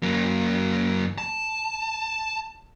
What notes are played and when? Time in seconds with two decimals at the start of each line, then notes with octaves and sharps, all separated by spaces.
0.02 F#2 A#3
1.18 A5